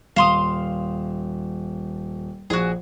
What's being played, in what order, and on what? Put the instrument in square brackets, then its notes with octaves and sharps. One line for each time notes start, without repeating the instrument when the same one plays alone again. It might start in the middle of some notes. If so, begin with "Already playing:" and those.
[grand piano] D#1 E7 F7 [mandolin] F5 C6 D#6
[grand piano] A#1 [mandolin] F#4 G#4